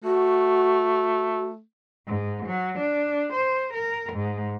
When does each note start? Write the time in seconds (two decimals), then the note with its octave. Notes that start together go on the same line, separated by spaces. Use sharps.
0.04 A3 F#4
2.07 G#2
2.46 F#3
2.79 D4
3.34 C5
3.74 A#4
4.13 G#2